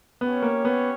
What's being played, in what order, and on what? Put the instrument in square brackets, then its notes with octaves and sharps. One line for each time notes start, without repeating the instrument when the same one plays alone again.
[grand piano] B3 [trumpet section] C#4 G4 C#5
[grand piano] A#3
B3